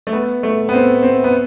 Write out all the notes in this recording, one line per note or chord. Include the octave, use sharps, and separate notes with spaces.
A3
B3
A3
B3
C4
C4
B3